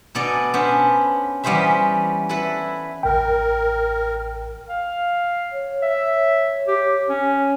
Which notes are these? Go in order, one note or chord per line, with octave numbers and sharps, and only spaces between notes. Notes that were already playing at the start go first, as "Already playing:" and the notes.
B2 B3 A4 D5 G#5 A#5
B3 C#4 D4 B4 C5
E3 G3 B3 C#4 C5 E5
E4 A4 B4 E5
A1 A#4 G5
F5
C#5
E5
G4
C#4